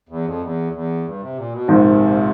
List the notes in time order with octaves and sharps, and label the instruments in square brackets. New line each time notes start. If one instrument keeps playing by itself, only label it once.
[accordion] E2
F2
E2
E2
G2
C3
A#2
B2
[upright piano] A#1 G#2 D#3 [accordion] C3